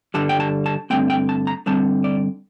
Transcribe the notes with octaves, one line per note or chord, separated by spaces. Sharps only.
G2 D3 G3 A5
G5
A5
A5
G2 D3 A3 C4 G5
G5
A5
A#5
G2 D3 G3 C4 A5
D5